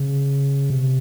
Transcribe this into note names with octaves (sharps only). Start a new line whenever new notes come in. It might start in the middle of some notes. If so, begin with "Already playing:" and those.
Already playing: C#3
C3